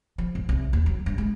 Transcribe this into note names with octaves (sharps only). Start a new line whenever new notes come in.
F3
G#1
C2
D#2
F#3
G2
G#3